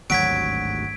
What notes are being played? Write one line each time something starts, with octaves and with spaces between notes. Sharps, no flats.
G#1 D2 G2 F#3 G#6 B6 D7